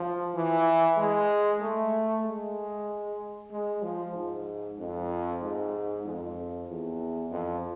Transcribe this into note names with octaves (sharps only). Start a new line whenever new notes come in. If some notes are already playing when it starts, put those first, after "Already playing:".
Already playing: F3
E3
G#3
A3
G#3
G#3
F3
G#2
F2
G#2
F2
E2
F2